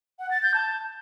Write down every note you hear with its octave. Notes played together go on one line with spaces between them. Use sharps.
F#5
A6
G6
A5